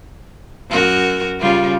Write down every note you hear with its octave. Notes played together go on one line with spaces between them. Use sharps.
F#2 F#4 A#4
C#3 G3 F4